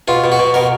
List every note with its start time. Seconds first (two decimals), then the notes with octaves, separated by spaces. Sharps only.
0.08 B2 F4
0.24 B2
0.32 F#4
0.39 B2
0.54 B2 A#4